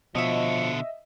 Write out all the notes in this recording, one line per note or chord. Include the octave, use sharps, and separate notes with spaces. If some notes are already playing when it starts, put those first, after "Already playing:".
B2 D3 F3 C#5 D#5 E5